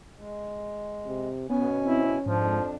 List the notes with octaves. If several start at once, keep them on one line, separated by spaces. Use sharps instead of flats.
G#3
C3
B2 B3 C#4 G#5
C4 E4
F2 G#2 F3 D4